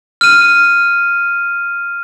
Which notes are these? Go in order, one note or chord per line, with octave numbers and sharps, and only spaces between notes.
F6 D#7